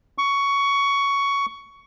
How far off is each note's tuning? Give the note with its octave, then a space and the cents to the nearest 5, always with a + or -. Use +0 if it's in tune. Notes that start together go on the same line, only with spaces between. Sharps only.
C#6 +15